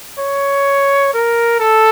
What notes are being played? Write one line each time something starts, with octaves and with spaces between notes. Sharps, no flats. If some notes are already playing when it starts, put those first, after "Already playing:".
C#5
A#4
A4